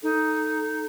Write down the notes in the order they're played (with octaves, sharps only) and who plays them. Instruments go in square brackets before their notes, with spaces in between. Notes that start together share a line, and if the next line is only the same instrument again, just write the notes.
[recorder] D#4 [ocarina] A4